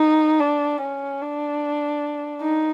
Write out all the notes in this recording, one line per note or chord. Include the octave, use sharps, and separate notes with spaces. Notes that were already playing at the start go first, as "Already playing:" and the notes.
Already playing: D#4
D4
C#4
D4
D#4